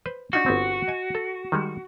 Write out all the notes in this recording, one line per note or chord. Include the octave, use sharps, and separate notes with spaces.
B4 C5
D4 D#4 F4 F#4
G1 B3 C4
D#5 G#5
A4
D#3 G3 G#3